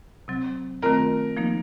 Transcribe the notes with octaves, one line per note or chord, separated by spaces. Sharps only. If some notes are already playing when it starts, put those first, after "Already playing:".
C3 F#3 C4
D#3 A3 C4 F4 A#4
F3 A#3 D#4